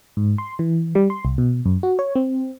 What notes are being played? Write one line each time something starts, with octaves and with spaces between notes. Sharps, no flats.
G#2
C6
E3
G3
C6
C2
B2
F#2
F#4
C#5
C4